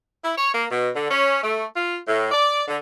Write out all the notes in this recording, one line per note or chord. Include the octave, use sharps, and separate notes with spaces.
E4
C#5
A#3
B2
D3
C#4
A3
F4
A2
D5
D3